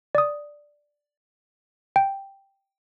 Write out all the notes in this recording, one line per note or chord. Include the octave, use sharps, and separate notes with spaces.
D5 D#6
G5